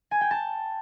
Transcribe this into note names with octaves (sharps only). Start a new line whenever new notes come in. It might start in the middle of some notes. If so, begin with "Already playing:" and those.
G#5
G5
A5